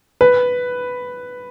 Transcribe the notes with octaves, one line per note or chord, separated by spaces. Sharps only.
B4